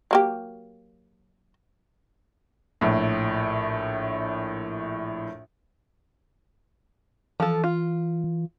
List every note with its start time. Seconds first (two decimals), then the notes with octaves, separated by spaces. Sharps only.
0.11 F#3 A#3 G4
2.81 A#1 A2
7.40 E3 F3 A4
7.64 F4
8.24 E3